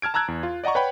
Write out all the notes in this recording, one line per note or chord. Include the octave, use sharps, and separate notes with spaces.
A5 F6 G#6 D7
A5 A#5 E6 F#6 G#6
E2
F4
D5 D#5 F#5 A#5 C#6
B4 C#5 F#5 G5 B5